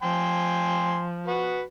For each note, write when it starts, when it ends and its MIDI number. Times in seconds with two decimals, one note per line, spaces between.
0.03 1.67 53
0.03 1.04 79
0.03 1.04 80
0.03 1.04 84
1.27 1.62 66
1.27 1.62 71